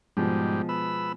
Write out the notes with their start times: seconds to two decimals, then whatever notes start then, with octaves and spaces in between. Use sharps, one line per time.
0.17 G#2 B2 F3 G3 G#3
0.69 B3 B5 E6